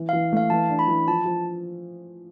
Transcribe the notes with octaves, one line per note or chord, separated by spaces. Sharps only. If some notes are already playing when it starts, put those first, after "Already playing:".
Already playing: E3
F5
E3
A3 F5
E3 A5
D4
B5
E3
F3 A5
F3